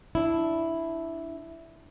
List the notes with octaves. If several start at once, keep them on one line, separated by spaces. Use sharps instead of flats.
D4 E4